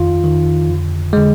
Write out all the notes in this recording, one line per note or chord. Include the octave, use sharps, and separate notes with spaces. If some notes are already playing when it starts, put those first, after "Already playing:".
Already playing: F2 D#3 F4
F2 D#3
F2 D3
D3 G#3